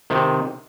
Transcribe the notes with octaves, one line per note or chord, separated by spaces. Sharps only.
C3 D#3